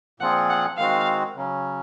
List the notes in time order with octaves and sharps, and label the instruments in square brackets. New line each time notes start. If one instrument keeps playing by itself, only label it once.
[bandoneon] A#2 F3 C4 F4 G#4 [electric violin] F#5
[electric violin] F#5
[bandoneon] D#3 G#3 C4 F#4 [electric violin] F5
[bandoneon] C#3 F#3 C#4